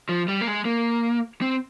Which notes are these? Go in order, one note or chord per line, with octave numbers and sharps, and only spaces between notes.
F3
G3
A#3
G#3
A#3
C4